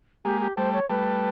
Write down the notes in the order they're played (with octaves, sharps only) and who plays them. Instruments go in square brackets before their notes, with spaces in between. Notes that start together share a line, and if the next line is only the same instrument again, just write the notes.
[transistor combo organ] G#3 A#3 [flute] G4
[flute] G4
[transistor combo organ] G3 A3 [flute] C5
[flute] C#5
[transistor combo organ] G3 A3 [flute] B4